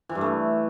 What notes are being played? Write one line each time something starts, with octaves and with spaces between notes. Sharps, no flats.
E3
G2
A3